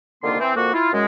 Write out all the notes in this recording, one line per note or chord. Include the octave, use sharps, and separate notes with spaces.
C2 D3 D#3 A#3 F4 C6
E3 C4
F2 A#3 F#4
E4 F4
F#2 G#3